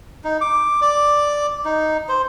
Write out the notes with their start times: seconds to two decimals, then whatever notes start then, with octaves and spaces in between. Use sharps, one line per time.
0.24 D#4
0.41 D6
0.82 D5
1.65 D#4
2.09 C5